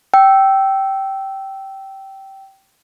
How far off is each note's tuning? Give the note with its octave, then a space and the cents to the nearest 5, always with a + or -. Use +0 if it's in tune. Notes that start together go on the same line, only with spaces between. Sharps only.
G5 -15 E6 +0